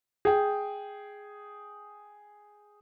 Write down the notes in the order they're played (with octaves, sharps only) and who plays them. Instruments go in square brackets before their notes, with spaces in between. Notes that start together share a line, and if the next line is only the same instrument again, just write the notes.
[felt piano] G#4 G5